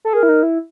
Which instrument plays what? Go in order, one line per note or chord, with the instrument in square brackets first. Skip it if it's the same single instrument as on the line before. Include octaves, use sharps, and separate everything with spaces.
[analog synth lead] A4
[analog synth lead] G#4 [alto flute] A#4
[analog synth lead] E4
D#4
E4